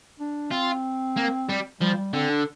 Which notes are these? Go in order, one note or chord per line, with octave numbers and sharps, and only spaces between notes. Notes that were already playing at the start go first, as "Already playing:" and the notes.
D4
C4 F4
A#3
G3
F3 G3
G3
D3 C4
D4